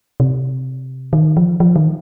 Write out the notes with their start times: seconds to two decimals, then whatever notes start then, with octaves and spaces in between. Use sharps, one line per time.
0.20 C3
1.13 D#3
1.37 F3
1.60 F3
1.76 D#3